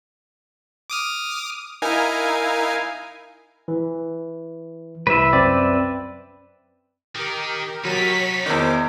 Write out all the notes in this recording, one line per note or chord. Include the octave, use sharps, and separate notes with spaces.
D6 D#6 F6
D#4 E4 A#4 F5 G#5
E3
C2 B4 E5
F#2 C4 D5
D#3 G4 A#4
F#3 D#4 A4 C#5 B6
E2 D#3 A#4 C5 D6